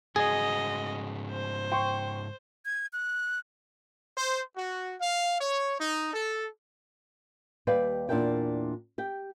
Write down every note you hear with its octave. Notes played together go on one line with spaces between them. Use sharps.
G#2 C#3 F#4 G#4 D#5
C5
G5 C6 C#6
G#6
F#6
C5
F#4
F5
C#5
D#4
A4
D#2 G3 B4 D5 F5 G5
E2 A#2 D4 E4 A#4 G5
G4 G5